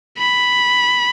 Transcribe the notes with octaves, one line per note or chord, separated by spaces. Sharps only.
B5